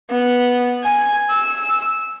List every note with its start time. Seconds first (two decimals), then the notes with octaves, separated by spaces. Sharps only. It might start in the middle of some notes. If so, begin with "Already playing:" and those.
0.11 B3
0.84 G#5
1.31 E6